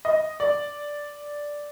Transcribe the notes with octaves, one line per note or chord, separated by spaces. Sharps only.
D#5
D5